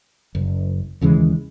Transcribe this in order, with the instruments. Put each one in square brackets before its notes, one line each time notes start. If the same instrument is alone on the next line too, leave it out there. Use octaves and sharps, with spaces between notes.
[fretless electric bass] F#1
D#2 C#3 E3 G#3